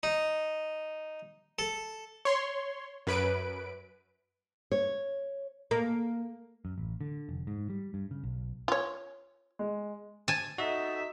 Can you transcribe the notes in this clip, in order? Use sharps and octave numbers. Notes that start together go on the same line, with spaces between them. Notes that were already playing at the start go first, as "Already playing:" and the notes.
D#4
A4
C#5 C6
F#2 B4 D7
C#5
A#3
F#2
A1
D3
F1
G#2
G3
G2
C#3
B1
F4 C#5
G#3
G#5 A5
D#4 F#4 A4 E5 D#6